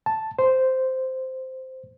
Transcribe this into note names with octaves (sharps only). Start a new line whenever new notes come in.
A5
C5